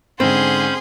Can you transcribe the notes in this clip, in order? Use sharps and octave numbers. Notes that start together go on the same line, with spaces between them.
G#2 D3 C4 C#4 G#4 B5 C6 G6